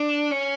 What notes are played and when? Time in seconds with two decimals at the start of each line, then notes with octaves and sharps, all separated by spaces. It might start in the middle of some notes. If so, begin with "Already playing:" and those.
Already playing: D4
0.31 C#4